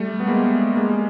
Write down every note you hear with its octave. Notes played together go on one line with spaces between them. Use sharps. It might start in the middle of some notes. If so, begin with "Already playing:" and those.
Already playing: G3 A3
B3
G#3 A#3
G#3 A#3